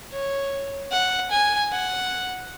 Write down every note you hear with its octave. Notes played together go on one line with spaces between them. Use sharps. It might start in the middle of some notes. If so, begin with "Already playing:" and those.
C#5
F#5
G#5
F#5